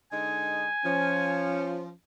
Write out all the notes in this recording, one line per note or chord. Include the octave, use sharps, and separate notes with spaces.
D3 G#3 D#4 G#5
F3 C#4